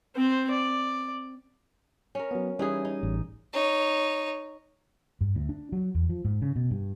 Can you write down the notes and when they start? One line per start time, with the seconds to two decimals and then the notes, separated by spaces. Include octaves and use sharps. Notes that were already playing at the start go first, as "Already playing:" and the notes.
0.16 C4 C5
0.51 D5
2.15 C#4 A#4
2.31 F#3 B3
2.59 E3 G3 C#4 D#4 G#4
2.85 D#4
3.03 A1
3.53 D#4 C#5
5.21 G2
5.35 D2
5.49 D4
5.72 F#3
5.95 E2
6.09 F3
6.25 G#2
6.42 C#3
6.56 B2
6.71 G2